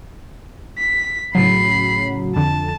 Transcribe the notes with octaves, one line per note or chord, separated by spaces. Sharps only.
B6
A2 C#3 F#3 B5 C7
F2 D3 A5